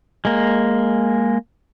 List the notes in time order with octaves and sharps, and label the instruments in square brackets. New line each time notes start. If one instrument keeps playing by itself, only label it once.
[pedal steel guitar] G#3 A#3